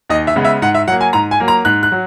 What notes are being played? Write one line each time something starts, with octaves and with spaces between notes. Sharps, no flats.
D#2 D#5
E5
C#3 G#3 B3
E5
G#2 F#5
E5
F#3 A#3 F#5
G#5
G#2 A#5
G#5
F#3 A#3
A#5
G#2 F#6
F#6
F#3